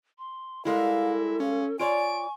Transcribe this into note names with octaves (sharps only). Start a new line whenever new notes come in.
C6
G3 G#3 E4 A4 A#4 F5
C#4 F5
F4 C#5 D5 G#5 C#6 D7